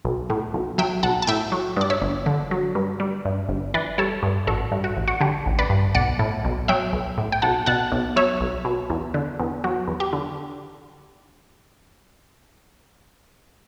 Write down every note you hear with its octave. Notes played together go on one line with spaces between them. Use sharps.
B1
A2
B1
F#3 E5 G5
B1 F#5 A5
A5
A2 E5 G5
F#3
G2 D5
C#5 E5
G1
D3
F#3
G2
G3
G2
G1
E3 B4 D5
G3 A4 C#5
G2
A1 F#4 A4
G2
F#4
A1
F#4
D3 G4
A1
B4 D5
G2
B1 D5 F#5
A2
B1
F#3 E5 G5
B1
A2
G5
B1 F#5 A5
B2 F#5 A5
B1
F#3 C#5 E5
B1
B2
E2
D3
E2
F#3 F#4
E2
G4
D3